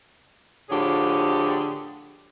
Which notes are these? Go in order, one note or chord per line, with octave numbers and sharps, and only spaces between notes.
A2 D3 F3 G4 G#4 C#5